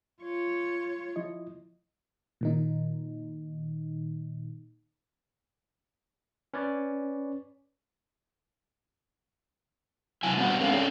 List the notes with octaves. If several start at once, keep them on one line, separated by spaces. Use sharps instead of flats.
F4 C#5
F3 E4 D#5
A#2 D#3 D#4
C#4 B4 C#5 D5
C3 F#3 E4 G#5
G3 B3 D4 F#4 C5 F#5
G#3 C#4 G#4 A#4 C5 F5
C#4 A4 C#5 D5 G5